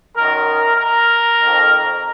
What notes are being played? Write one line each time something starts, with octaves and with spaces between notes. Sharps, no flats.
F#2 D#3 A#4
A#4
F2 D#3